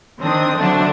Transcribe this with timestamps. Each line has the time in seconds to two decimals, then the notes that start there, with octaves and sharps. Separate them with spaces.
0.19 D#3 C4 D4 D#6
0.57 D3 F#3 A3 C4 D4